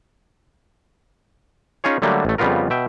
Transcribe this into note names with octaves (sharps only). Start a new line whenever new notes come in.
C#4 D#4 F4 G#4 C#5
D3 F#3 G3 A3 A#3
A1 A3
F2 C#3 G3 B3 F4 A#4
B2 E5 G5